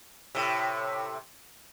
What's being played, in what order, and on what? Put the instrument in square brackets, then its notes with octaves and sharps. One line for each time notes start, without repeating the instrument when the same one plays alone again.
[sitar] A2 C3